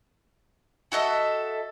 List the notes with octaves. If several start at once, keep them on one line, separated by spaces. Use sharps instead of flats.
F#4 A4 D#5 E5